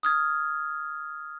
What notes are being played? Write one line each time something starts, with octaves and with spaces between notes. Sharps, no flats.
D#6 F6 G#6